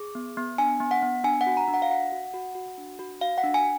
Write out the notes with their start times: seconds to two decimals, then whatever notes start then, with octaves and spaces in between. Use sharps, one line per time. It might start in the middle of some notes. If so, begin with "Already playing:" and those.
Already playing: G#4 D6
0.15 B3
0.37 B3
0.58 D4 G#5
0.80 B3
0.91 F#5
1.02 B3
1.24 D4 G#5
1.41 F#5
1.46 F#4
1.57 A#5
1.68 D4
1.74 F#5
1.82 F5
1.90 F#4 F#5
2.12 F#4
2.34 F#4
2.55 F#4
2.78 D4
2.99 F#4
3.21 F#4 F5
3.38 F#5
3.44 D4
3.54 G#5